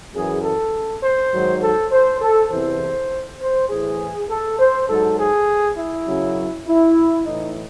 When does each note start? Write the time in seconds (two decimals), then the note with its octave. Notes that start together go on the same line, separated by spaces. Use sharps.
0.14 F#2 E3 G#4
0.43 A4
1.02 C5
1.31 G#2 D#3 F#3
1.61 A4
1.92 C5
2.21 A4
2.51 E2 C3 E3 C5
3.40 C5
3.69 A2 E3 G#4
4.29 A4
4.59 C5
4.88 G#2 F#3 A4
5.19 G#4
5.77 E4
6.06 F#2 C#3 F#3
6.67 E4
7.25 A2 E3 D#4